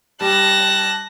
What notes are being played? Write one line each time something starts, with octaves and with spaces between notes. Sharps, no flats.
G3 A5 F#6 A#6